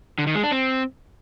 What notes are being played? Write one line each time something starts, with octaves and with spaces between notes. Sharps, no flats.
D3
D#3
G#3
D4
C4